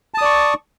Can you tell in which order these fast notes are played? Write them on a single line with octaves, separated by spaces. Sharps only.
A5 D#6 D5 C#6